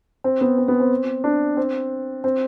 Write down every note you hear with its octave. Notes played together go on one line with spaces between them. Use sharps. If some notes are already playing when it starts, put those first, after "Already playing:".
C4
B3
C4
B3
C4
D4
C4
C4